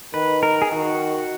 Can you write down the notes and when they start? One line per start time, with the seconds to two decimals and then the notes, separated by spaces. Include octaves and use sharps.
0.13 D#3 B4
0.43 A#4
0.62 G#4
0.72 D#3 F#4